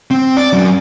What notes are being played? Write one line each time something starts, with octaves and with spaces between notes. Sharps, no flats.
C4
D5
F#2